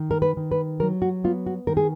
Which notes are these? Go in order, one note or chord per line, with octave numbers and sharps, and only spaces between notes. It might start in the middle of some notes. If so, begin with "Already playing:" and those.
Already playing: D#3
A#4
B4
D#3
B4
F#3 A#4
F#4
B3 F4
F#4
D#3 A#4
G#4